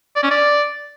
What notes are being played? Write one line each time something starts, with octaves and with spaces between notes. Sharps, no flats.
D5
C#4
D5